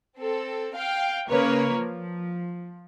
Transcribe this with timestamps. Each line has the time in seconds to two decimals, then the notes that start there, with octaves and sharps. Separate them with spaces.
0.18 C4 A4
0.76 F5 G5
1.31 C#3 A#3 A#4 B4 C#5
1.72 F3